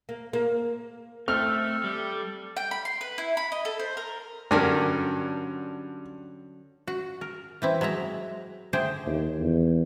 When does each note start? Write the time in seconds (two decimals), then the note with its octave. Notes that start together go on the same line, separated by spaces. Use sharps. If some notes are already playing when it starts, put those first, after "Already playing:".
0.09 A#3
0.33 A#3
1.28 A3 C4 A4 F6
1.84 G3
2.57 G5
2.71 B5
2.85 C6
3.01 B4
3.18 E4
3.37 B5
3.52 D#5
3.65 A4
3.80 C5
3.97 A#4
4.51 G2 D3 F#3 C#4 D4 A#4
6.87 F#4
7.21 A#4
7.62 E3 C4 E4
7.81 F#3 G#3 E5 A#5
8.73 D3 A3 G#4 C5 G5
9.06 D#2
9.39 E2